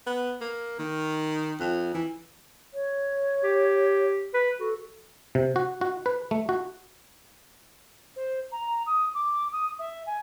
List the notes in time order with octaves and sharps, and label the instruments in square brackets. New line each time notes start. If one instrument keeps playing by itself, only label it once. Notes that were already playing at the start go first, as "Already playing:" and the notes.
[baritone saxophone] B3
A#3
D#3
F2
E3
[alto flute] C#5
[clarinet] G4
B4
[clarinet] F#4 [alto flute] A4
[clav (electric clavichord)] C3
F#4
F#4
B4
A3
F#4
[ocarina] C5
A#5
D#6
D6
D#6
E5
G#5